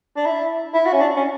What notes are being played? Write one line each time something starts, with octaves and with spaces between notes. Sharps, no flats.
D4
E4
E4
F#4
C#4
D4
C#4